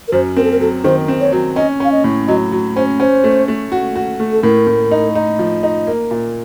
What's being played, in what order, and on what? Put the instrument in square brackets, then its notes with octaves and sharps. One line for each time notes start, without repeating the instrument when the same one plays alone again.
[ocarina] A#4
[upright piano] F#2 [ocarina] C5
[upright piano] C4 [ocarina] A#4
[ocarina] A4
A#4
[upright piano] F#3 [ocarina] A4
[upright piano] D#3 [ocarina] C5
[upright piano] C4
[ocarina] C#5
[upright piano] F#3
[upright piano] C#4 [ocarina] D#5
[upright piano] C#4 [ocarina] F5
[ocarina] D#5
[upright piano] A2
[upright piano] F#3 [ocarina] D#5
[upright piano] F#3
[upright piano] C#4 [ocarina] C5
[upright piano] C#4 [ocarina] C5
[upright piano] A3
A3
F#4
F#4
A3
[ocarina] A4
[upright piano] A2 [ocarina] A#4
[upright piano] A2
D#4
D#4
F3
D#4
A#3
A#2